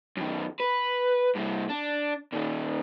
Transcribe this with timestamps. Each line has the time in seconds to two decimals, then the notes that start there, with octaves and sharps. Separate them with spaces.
0.17 F#2 D#3
0.60 B4
1.36 G2 C3
1.70 D4
2.32 A#2 D#3